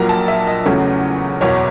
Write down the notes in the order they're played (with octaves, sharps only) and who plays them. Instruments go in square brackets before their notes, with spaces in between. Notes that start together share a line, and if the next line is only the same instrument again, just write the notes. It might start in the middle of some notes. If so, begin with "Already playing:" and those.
Already playing: [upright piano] A#1 A#2 F#3 A#3 A#5
A5
E5
D#5
E2 C#3 F#3 A3 C#4
F#1 E2 B2 C#5